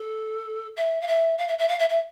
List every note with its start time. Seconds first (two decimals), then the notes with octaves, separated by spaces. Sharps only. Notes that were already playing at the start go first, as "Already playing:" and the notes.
Already playing: A4
0.77 E5
1.01 F5
1.08 E5
1.38 F5
1.48 E5
1.58 E5
1.68 F5
1.79 E5
1.89 E5